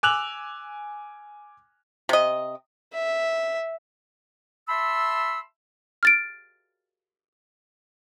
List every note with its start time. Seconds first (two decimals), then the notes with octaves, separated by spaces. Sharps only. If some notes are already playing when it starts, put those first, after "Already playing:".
0.03 G#5 D6 E6 F#6 F7 F#7
2.09 C3 D#5
2.93 E5
4.69 E5 A5 B5 C6 E6
6.03 F6 A6 D7